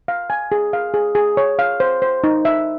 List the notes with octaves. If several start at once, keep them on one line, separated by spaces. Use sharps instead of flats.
F5
G#5
G#4
F5
G#4
G#4
C#5
F5
C5
C5
D#4
E5